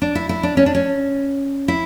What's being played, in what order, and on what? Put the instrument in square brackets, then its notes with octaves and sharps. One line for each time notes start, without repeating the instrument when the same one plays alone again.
[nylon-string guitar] D4
E4
E4
D4
C#4
D4
C#4
E4